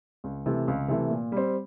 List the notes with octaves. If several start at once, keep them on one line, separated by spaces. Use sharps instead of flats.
C#2
C3 E3 A3
C#2
C3 E3 A3
A#2
G3 C4